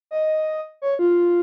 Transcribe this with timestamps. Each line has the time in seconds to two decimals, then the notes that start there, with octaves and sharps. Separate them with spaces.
0.11 D#5
0.82 C#5
0.99 F4